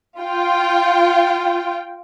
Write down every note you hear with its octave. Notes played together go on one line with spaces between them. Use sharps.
F4 G5